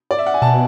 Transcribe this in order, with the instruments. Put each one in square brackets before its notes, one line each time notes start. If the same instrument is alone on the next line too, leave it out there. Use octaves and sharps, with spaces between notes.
[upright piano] D5
E5
F#5
G#5
[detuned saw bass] B2 [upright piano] A5